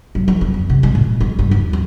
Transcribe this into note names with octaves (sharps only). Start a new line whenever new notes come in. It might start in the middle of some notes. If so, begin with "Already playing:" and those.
F#3
F3
B3
F2
C3
G#3
A#2
G#3
G2
D#2
F3